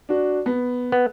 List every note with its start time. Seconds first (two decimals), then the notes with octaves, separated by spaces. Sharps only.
0.09 D4 F#4
0.46 B3
0.92 B3